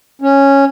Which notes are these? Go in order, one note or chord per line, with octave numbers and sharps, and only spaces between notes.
C#4